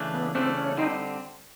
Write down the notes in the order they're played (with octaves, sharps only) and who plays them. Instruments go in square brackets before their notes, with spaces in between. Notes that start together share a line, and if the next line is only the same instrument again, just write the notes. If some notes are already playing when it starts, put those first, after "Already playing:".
Already playing: [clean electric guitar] C#3 E3 A3 D4
[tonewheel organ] B3
[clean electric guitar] C#3 E3 A3 D4 [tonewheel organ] C4
[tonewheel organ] C#4
[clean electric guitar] D3 G3 C4 [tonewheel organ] D#4